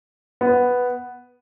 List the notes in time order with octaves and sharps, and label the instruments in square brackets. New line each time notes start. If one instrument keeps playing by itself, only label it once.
[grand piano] B3